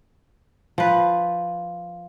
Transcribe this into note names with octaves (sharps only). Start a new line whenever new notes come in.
F3 B4